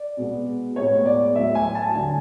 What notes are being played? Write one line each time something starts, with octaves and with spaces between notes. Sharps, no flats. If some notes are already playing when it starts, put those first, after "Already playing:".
Already playing: D5
B2 G#3 B3
A2 G#3 B3 C#5
D5
A2 F#3 A3 E5
G#5
A5
D3 F#3 A3 G#5